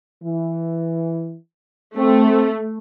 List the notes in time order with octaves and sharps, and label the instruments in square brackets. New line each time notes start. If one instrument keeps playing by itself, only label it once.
[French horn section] E3
[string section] A3 [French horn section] C4